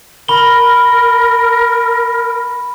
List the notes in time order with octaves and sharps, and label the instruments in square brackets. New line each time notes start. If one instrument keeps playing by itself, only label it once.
[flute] A#4 [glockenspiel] B5 G7